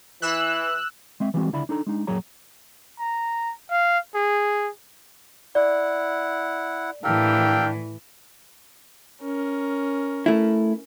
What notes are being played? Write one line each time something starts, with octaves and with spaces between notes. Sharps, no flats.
E3 E6 F#6
G#3 C4 E5
E3 G3 G#3 A#3 C4 F#4
C#2 D3 E4 D5 E5 B5
D4 D#4 A4 A#5
G#3 D4 D#4
F#2 A#2 F#3 G#4 C#5 A#5
A#5
F5
G#4
E4 D5 F#5
A2 E3 D4 G4 A4 A#4 F5 G5
C#4 A#4
A3 E4